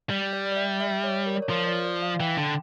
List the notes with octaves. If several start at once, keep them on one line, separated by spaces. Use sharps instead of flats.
G3
D5
D5
E5
E5
C#5
A#4
D5
C#5
F3 A#4
D5
D5
F5
E3 G5
D3